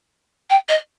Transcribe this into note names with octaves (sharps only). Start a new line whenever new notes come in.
G5
D#5